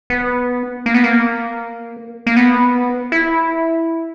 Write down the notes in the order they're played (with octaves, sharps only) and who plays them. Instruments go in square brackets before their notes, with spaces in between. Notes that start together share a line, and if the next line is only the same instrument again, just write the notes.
[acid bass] B3
A#3
B3
A#3
A#3
B3
E4